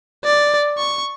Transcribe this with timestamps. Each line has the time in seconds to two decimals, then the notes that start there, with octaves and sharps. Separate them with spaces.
0.24 D5
0.78 C#6